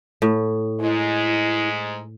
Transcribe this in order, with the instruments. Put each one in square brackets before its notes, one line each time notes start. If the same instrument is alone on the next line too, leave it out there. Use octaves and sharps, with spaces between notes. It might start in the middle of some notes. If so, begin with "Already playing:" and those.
[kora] A2
[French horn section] G#2 G#3 [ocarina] E4